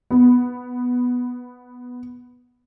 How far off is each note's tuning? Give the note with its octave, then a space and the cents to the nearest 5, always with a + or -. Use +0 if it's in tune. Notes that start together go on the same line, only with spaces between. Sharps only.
B3 +0